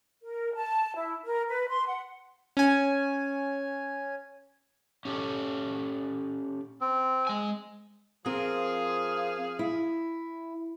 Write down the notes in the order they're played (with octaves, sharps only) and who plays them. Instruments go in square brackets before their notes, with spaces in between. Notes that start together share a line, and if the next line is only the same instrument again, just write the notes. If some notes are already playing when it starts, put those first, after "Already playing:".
[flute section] A#4
A5
E4
A#4
B4
C6
F#5
[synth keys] C#4 G#5
[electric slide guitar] C#4 G4 A4
[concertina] C4
[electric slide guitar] G#3 G#5
[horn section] F3 G#4 F5 [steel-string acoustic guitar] C4 A#4
[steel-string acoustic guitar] E4